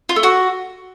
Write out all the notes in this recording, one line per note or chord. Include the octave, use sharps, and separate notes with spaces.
F4
A3
F#4